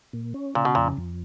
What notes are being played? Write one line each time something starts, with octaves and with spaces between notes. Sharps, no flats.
A#2
C#4
A#2 C#3
B2
F2 A#2
F2